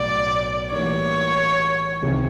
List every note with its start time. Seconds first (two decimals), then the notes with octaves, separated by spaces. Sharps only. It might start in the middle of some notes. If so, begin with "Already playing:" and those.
Already playing: B1 A2 F#3 D5
0.71 A2 E3 G3 A#3 D#4 C#5
2.02 C#2 C3 D#3 G#3 C4